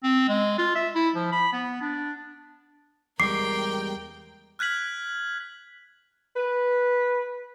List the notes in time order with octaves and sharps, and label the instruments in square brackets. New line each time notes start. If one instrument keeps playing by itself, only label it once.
[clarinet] C4
G#3
F4
E5
E4
F3
B5
B3
D4
[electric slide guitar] E2 G3 G#3 [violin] A#4 G5 [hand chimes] D6 [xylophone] C7
[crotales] F6 F#6 G#6 B6 F#7
[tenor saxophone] B4